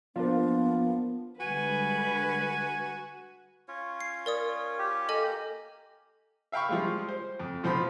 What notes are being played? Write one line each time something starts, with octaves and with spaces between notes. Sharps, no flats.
F3 A#3 B3 D4 F4
D3 G3 G#3 F#4 B4 G#5
C#4 F4 C#5
C7
A#4 D5 D#6
G4
A#3 A4 D#5 G#5 A#5
E5 F5 G5 B5 C#6
F3 G3 G#3
C5
F2
B1 F3 C5 B5